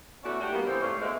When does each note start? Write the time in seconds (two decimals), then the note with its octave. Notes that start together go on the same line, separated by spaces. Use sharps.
0.24 A3 B3 C#4 D4 E4 F#4
0.41 A2 A3 D4 F#4 G4
0.53 G3 A#3 B3
0.67 A2 E3 C4 G4 C5
0.82 G#2 A3 C#5 D5 F5
1.02 B2 D3 G#3 A3 E5